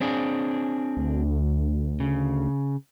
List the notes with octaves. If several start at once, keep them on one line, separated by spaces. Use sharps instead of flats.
C4 D4 G#4
D2
C#3